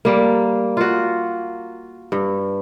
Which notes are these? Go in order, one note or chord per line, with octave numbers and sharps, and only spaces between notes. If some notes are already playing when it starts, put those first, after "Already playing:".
G3 A#3
F4 F#4
G2